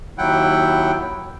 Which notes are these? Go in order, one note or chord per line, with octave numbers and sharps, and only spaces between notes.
D#2 F#3 E4 F#5 G5